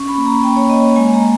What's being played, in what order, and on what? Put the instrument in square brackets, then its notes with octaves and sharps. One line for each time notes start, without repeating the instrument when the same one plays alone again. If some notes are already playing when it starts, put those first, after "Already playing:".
Already playing: [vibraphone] C#4 C#6
B5
A#3
A#5
A#3 G5
C#5
A#3 D#5
G#3 G#5
A#5